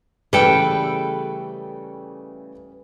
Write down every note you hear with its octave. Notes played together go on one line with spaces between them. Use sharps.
C#3 E3 G3 A3 A4 B4 G5